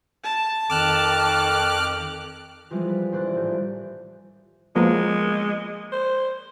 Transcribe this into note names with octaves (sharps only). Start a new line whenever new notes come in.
A5
F2 D#3 D6 F6 F#6
E3 F3 G3 G#3 C4 F4
B4
D#1 C5 D5 F#6
G#1 A2 G4
F3 G#3 A#3 B3
C5